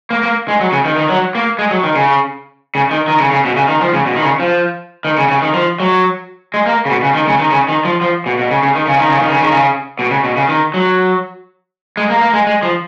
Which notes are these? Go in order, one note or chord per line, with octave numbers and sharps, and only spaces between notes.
A#3
A#3
G#3
F#3
C#3
D#3
D#3
F#3
A#3
G#3
F#3
D#3
C#3
C#3
D#3
D#3
C#3
C#3
B2
C#3
D#3
F3
C#3
B2
D#3
C#3
F3
D#3
C#3
C#3
D#3
F3
F#3
G#3
A#3
C#3
B2
C#3
D#3
C#3
D#3
C#3
D#3
F3
F3
B2
B2
C#3
C#3
D#3
C#3
D#3
C#3
D#3
C#3
D#3
C#3
B2
C#3
B2
C#3
D#3
F#3
G#3
A#3
A#3
G#3
G#3
F3